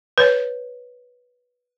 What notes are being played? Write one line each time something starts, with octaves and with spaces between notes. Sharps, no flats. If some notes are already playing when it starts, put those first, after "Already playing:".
B4 C#5